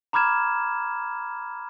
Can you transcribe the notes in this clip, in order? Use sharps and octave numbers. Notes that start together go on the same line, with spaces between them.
A#5 B5 D6 F6 G#6 E7